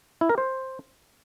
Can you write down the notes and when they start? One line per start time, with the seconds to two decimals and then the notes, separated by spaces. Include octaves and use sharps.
0.21 E4
0.29 A#4
0.38 C5